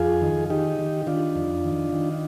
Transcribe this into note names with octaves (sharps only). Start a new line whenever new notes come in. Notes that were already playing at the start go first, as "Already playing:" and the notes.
Already playing: F2 F4 G#4
D#3
D#3 D#4 G4
D#3
D#3 D4 F4
F2
D#3
D#3